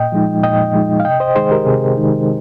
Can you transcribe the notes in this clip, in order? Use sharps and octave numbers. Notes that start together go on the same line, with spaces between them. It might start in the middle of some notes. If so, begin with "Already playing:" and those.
Already playing: A#2 D#5 G5
F3 G#3 D#4
A#2 D#5 G5
F3 G#3 D#4
F5
C3 D#5 G5
C5 D#5
D#3 G#3 D#4 G#4 C5
G4 A#4
C3 G#4
D#3 G#3 D#4